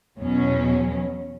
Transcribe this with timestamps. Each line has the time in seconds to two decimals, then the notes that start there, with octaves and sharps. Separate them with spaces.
0.18 E2 B2 F#3 C#4